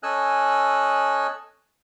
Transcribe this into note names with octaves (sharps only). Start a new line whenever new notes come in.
C#4 A4 D#5 G#5 E6 F#6